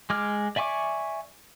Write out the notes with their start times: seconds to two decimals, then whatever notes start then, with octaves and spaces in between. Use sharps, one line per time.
0.10 G#3 D6 F6
0.56 D5 E5 G#5 C#6 D6